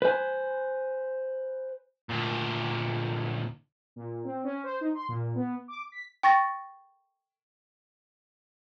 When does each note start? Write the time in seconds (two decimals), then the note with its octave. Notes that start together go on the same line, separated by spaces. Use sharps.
0.02 B4 C5 G#5
2.10 D2 A#2
3.96 A#2
4.24 C4
4.44 C#4
4.64 C5
4.81 D#4
4.95 C6
5.08 A#2
5.35 B3
5.68 D6
5.92 B6
6.23 G5 C#6 A6 A#6